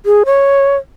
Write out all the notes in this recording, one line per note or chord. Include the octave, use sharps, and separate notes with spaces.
G#4
C#5